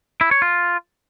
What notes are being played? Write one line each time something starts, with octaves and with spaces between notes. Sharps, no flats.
E4
C#5
F4